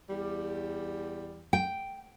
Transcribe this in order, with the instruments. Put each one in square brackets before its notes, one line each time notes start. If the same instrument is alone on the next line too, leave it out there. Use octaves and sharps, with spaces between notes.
[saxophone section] E2 G3
[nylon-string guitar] G5